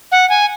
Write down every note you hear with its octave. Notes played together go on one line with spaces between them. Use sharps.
F#5
G#5